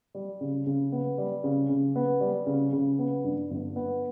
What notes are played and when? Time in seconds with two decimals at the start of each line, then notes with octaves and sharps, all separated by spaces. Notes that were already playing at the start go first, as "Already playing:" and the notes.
0.15 G3
0.41 C#3
0.67 C#3
0.92 B3
1.18 G3
1.44 C#3
1.69 C#3
1.96 B3
2.21 G3
2.47 C#3
2.73 C#3
2.99 B3
3.24 G2
3.50 G1
3.76 B3